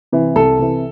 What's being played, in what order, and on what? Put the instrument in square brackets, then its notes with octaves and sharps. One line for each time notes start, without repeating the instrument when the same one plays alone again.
[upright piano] C3 E3
C2 A4
C3 E3